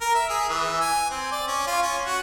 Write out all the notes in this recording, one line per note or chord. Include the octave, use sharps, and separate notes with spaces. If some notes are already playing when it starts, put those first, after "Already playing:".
A#4
E5
G#4
E3
G#5
C4
D5
C#4
F4
C#4
F#4